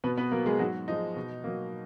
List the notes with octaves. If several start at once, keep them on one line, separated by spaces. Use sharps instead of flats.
B2 B3 B4
B3 B4
F#3 A#3 A#4
G#3 G#4
G#2 F#3 F#4
F3 G#3 D#4
B2
F#3 A#3